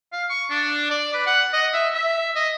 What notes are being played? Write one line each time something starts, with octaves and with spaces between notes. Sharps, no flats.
F5
C#6
D4
D5
B4
F#5
D#5
E5
E5
D#5